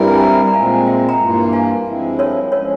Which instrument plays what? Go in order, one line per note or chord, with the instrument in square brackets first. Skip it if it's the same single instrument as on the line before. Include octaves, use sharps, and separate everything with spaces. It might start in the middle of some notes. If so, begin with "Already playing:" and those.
Already playing: [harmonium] G2 G3 C4 E4 A#4
[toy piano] G#5
G5 A#5
A#5
[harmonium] A#2 G#3 C4 [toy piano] F5 G#5
[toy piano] E5 G5
G5 A#5
[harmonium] G2 E3 A#3 F4
[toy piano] F5 G#5
[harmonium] G2 F3 G#3 C4 E4
[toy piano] A#4 C#5
[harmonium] F3 G#3 C#4 [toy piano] A#4 C#5